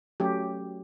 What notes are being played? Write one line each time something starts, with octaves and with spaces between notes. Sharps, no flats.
F#3 A3 C#4 G4